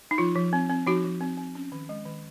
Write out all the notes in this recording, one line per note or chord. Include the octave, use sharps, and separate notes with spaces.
D#4
F3 F4
F3
C4
C4
F3 D#4 F#4
F3
C4
C4
C#4
D#3
G#3
D#3